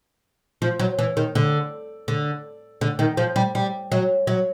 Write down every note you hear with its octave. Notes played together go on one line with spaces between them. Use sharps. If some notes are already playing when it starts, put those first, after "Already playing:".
F3
F#3
E3
D#3
D3
D3
D3
D#3
F3
G3
G3
F#3
F#3